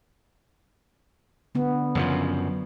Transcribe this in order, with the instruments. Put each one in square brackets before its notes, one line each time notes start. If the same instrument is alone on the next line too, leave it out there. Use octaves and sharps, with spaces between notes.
[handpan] D3 B3
[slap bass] F#2 C#3 F3